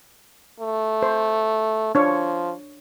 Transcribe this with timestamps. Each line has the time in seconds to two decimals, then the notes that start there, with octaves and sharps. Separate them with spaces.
0.60 A3
1.03 C5
1.95 F3 D4 C#5